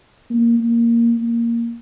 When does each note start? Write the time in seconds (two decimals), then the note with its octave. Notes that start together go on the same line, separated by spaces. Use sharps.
0.30 A#3
0.60 A#3
1.17 A#3